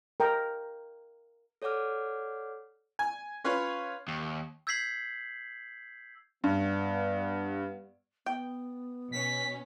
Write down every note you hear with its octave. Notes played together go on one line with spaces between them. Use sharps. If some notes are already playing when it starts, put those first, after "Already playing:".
A#4 G5 A#5
A4 C#5 D5 F#5 D6 F6
G#5
C#4 F4 B4 C#5
D#2
E6 G6 G#6 B6 C7 F#7
G2 G3 B3
B3 G5
B2 C#4 B6